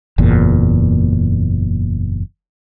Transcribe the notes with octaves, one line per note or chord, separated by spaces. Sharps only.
F#1 E2 A#2